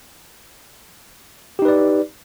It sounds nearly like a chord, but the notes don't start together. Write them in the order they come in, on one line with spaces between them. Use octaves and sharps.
G4 D#4 B4 D5